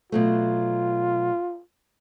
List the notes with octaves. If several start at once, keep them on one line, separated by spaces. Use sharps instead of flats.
B2 F#3 A3 F4